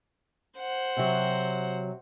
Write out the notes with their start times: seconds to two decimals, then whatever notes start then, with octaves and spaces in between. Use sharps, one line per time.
0.59 C5 F#5
0.97 C3 F#3